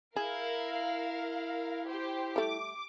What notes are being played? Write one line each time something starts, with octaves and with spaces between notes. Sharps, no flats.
E4 G#4 A#4 F5
G4 C5
G3 A3 D6